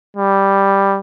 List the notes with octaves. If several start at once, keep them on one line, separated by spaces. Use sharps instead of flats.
G3